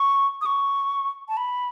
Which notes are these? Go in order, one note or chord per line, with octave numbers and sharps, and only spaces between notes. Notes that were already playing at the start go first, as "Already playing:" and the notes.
Already playing: C#6
D#6
C#6
A5
B5